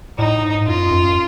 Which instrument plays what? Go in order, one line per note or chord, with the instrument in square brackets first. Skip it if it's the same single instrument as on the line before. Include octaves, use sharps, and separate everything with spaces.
[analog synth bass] A2 [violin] D#4
[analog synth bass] G#2
[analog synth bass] F#2 [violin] F4
[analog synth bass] F#2